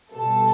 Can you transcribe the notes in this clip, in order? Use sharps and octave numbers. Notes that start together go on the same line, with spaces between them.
B2 G3 B3 A4